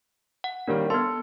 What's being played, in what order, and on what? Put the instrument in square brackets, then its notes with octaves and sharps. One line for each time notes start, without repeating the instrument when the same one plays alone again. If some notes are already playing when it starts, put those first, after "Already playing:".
[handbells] F#5
[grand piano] D#3 G3 A#3 [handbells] D4 C#5
[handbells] B3 C6 [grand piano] A4